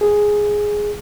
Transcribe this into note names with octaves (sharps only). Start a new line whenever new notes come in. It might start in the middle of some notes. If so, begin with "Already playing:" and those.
G#4